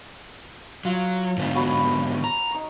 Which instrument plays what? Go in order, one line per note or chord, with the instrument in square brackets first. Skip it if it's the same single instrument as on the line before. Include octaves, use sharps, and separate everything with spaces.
[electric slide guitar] F#3 [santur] F4
[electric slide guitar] G#2 D3 B3
[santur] F#4 C#5 B5
[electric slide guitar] A#5
[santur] D#4 C#6